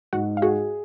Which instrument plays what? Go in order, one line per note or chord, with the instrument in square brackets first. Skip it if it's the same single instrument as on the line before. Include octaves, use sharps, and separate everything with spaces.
[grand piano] G#2 [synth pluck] F#4 F#5
[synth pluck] F5
[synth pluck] F#4 F#5 [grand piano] G#4